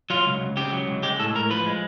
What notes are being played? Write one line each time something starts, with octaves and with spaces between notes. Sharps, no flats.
F#3 F4
C#2
C#2
C#3 G4
F#3
C#2
G#3 G4
A2 A4
A2 A#4
F3 B4
G#3